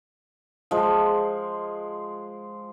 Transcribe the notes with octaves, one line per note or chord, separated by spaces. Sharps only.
F3 G#3